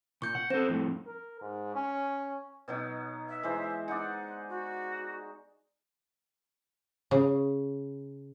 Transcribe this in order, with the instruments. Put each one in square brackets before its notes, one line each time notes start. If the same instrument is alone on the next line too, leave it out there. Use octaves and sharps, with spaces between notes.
[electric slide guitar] A#2 [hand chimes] C#6 G6
[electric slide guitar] F#5
[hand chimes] C4 [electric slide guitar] A4 C5
[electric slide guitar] F2 A2
[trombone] A#4
G#2
C#4
[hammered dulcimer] B2 F#3 D#4
[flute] E5
[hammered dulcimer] E3 G#3 C5
[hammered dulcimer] D#4 D5 [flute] F#5
[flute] F#4
[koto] C#3